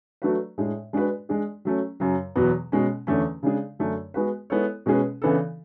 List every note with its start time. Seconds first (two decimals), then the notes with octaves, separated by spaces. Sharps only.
0.22 F#3 A3 D4 F#4 B4
0.58 A2 G#3 D4 G#4
0.93 G#3 D4 F#4 B4
1.29 G#3 D4 G#4
1.65 F#3 A3 C#4
2.00 F#2 C#3 F#3
2.35 E2 B2 F#3 B3
2.72 B2 G#3 C#4
3.07 E2 D3 A3 C#4
3.43 C#3 G#3 D4 G#4
3.79 F#2 D3 A3 D4
4.14 G#3 B3 F#4 B4
4.50 G#3 B3 E4 A4 C#5
4.86 B2 G#3 C#4 G#4 B4
5.22 C#3 E3 B3 D4 A4